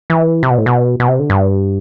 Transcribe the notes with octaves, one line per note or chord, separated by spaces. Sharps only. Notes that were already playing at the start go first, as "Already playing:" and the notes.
E3
C3
B2
A2
B2
B2
C3
D3
G2